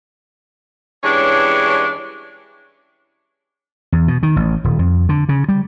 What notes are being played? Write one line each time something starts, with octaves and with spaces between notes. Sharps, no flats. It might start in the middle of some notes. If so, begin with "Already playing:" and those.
G2 E3 G#3 C#4 D4 C#5
E2
B2
D#3
A1
D#1
F2
D3
C#3
G3